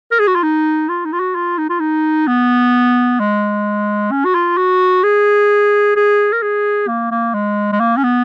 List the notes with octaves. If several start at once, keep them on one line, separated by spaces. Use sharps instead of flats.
A#4
G#4
F#4
F4
D#4
F4
D#4
F4
F#4
F4
D#4
F4
D#4
B3
G#3
C#4
F#4
F4
F#4
G#4
G#4
A#4
G#4
A#3
A#3
G#3
G#3
A#3
C#4
B3